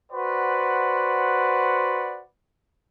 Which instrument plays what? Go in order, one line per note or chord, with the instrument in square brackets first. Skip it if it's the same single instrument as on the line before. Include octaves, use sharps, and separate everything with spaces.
[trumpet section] F#4 B4 C5 D5 F#5